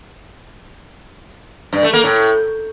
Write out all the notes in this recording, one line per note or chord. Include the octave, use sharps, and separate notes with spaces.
G2
A3
A#3
A2